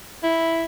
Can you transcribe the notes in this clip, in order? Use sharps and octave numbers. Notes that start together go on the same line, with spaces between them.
E4